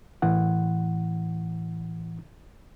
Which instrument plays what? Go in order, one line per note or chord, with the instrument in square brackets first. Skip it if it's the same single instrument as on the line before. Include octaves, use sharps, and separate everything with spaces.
[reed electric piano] A2 E3 F#5